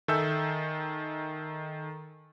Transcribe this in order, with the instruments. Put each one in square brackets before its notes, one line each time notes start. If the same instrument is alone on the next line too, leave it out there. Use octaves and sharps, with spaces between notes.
[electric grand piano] D#3 A4 E5 G#5 E6 G6